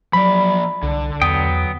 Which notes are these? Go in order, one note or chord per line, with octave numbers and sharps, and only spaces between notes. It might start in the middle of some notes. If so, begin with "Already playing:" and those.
F3 F#3 D5 B5
C2 D3
E2 F#3 B3 G5 D#6